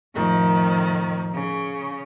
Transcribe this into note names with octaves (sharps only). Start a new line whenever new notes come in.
F2 A2 D#3
C#3